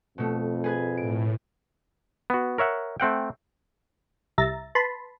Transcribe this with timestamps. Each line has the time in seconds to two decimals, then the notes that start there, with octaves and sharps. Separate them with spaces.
0.18 F2 B2 A3
0.64 G#4 B4 G#6
0.97 A2 D7
2.30 B3 F#4
2.58 A#4 C#5 E5 F#5
3.00 A3 C4 F#5 G5
4.38 C2 E5 A#5 A6
4.75 B4 A5 B5 C6